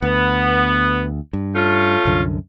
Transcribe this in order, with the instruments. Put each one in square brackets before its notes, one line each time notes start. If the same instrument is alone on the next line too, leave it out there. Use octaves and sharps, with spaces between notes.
[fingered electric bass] D2 [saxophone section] B3
[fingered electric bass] G2
[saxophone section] A3 C#4 F4
[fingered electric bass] C2 F#2 D3